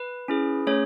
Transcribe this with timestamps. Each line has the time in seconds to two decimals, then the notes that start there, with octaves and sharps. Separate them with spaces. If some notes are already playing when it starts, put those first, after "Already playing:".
Already playing: B4
0.28 C#4 E4 G#4
0.67 A3 C#4 G#4 C#5